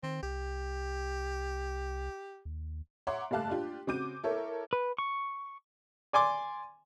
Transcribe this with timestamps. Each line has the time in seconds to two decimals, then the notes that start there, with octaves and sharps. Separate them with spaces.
0.03 D#3 C4
0.23 C2 G4
2.45 D#2
3.07 C#5 E5 F#5 A#5 C6 D6
3.31 F#1 G2 A3 F5 A5 F#6
3.50 D4 F4 G4
3.87 C#3 C4 F#4 D6 G6 D#7
4.23 E4 A4 A#4 C#5
4.73 B4
4.98 C#6
6.13 D5 G#5 C6 D6